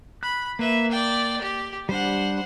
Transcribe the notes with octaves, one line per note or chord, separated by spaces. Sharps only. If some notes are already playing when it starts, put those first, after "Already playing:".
B5 F#6
A#3 B4 E5
D5 G5
G4
G3 D4 C5 F#5